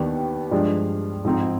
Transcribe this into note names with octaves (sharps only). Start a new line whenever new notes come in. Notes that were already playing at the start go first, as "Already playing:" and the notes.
Already playing: D#2 D#3 B3 D4 G4
G2 F3 G#3 D4
G#2 F3 C4 D#4